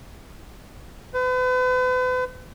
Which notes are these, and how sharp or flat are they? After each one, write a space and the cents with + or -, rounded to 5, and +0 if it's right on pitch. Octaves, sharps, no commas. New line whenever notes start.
B4 +40